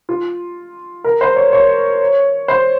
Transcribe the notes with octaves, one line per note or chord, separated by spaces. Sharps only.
F4
A#4
C5
C#5
C#5
C5